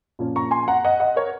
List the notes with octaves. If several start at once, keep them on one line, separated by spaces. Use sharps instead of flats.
A#2 F3 A#3 C#4
A#5 C#6
G#5 C6
F#5 A#5
D#5 F#5
D#5 F#5
A#4 C#5